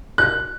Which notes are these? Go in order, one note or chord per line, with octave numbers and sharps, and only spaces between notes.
F#6